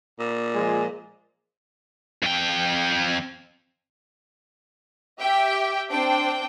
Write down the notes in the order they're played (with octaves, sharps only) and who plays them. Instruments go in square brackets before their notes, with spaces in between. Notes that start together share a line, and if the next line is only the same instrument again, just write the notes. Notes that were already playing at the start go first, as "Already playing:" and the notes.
[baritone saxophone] A#2
[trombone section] F3 G#3 G#4
[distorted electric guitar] F2 G5
[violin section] G4 E5 G5
C4 D4 C5 G5